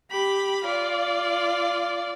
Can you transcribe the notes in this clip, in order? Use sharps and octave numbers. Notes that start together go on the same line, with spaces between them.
G4 B5
F4 D5